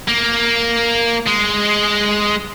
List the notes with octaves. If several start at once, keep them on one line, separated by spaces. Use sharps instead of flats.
A#3
G#3